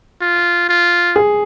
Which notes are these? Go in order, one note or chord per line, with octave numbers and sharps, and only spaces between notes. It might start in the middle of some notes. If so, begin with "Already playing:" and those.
F4
F4
G#4